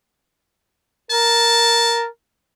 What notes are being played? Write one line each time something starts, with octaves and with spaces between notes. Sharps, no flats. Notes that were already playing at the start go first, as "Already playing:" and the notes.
A#4 A5